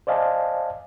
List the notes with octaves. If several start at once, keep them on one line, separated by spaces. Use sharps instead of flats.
C5 D5 D#5 F5 G#5 A5